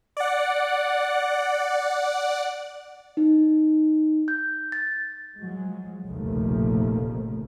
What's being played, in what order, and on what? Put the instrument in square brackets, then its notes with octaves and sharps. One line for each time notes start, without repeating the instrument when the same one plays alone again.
[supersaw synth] D5 F#5
[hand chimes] D#4
G6
A6
[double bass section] F3 F#3 G#3
F1 A#1 D#2 C#3 F3 A3